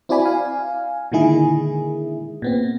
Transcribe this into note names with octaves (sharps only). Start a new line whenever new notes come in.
C4 E4 F#4 D5 G#5 B5
F5 G#5
A#2 D3 D#3 G#3 E4 G#4
A#2 B3 C4